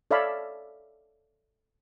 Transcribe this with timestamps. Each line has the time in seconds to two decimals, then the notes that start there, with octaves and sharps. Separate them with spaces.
0.11 A4 C#5 D5 E5 F5 B5